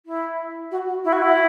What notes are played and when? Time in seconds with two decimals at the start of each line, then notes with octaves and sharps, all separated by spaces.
0.05 E4
0.70 F#4
0.87 F#4
1.04 E4
1.12 F#4
1.21 E4